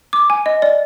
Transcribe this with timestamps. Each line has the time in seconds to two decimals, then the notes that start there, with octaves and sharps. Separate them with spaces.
0.13 D6
0.30 G#5
0.46 D#5
0.62 D5